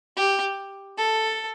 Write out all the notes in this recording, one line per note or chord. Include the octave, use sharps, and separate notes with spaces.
G4
A4